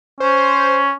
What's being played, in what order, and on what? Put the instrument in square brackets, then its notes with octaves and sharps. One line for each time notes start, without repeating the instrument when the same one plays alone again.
[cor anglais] C#4 [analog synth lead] C5